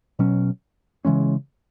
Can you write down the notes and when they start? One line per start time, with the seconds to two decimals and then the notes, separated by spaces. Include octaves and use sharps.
0.19 B2 F#3 C#4
1.05 C#3 E3 G#3 C#4